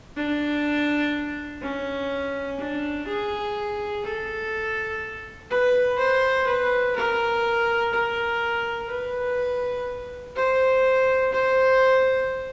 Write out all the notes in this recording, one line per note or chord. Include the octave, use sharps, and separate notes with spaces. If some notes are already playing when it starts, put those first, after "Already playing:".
D4
C#4
D4
G#4
A4
B4
C5
B4
A#4
A#4
B4
C5
C5